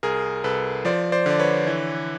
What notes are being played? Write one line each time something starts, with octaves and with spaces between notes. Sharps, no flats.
C2 G#4 A#4
C2 A4 B4
F3 C5 D5
C5 D5
D3 D5
B4 C#5
E3